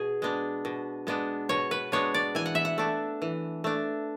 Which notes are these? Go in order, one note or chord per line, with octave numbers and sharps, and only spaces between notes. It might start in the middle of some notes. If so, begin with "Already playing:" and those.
Already playing: B2 G#4
G#3 B3 D4
B2
G#3 B3 D4
B2 C#5
B4
G#3 B3 D4 C#5
D5
E3 G#5
F#5
E5
F#5
A3 D4
E3
A3 D4